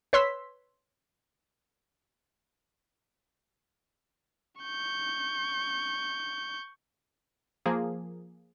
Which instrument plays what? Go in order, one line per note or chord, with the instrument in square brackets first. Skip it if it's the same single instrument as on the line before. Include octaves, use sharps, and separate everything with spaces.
[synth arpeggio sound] B4 C#5 C6 E6 B6
[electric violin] C#6 G6
[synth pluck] F3 A#3 G#4